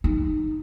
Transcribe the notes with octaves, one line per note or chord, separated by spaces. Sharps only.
D#4